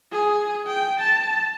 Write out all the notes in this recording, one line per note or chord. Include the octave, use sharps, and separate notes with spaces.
G#4
G5
A5